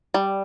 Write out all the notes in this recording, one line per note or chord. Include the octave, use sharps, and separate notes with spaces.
G3